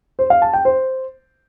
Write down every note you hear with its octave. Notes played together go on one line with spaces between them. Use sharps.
C5
F5
A5
G5
C5